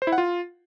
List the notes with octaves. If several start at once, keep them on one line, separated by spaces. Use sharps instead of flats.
C5
E4
F#5
F4